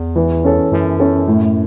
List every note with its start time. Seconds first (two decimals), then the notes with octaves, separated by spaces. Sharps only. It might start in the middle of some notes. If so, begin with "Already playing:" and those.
Already playing: E2
0.16 E3
0.44 C#4 A4 C#5
0.72 F#2 E3
1.00 C#4 A4 C#5
1.27 A2